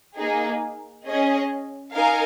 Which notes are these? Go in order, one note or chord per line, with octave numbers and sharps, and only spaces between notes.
A#3 D#4 G#4
C#4 G#4 D#5
D#4 A#4 F5 G#5